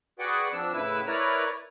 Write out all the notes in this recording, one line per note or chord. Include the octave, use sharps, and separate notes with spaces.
F#4 G#4 B4 D5 F#5 G5
F3 C4 D4 E6
A2 C#3 E4 B4 E6
E4 A#4 B4 C#5 D5 A#5